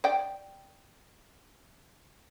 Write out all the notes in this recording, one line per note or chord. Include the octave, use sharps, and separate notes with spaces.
D5 G5